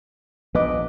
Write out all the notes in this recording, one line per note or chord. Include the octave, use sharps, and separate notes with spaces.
A#1 F3 B3 B4 D#5 D6